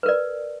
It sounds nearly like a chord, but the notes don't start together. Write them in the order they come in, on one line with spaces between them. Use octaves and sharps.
B4 A#4 D5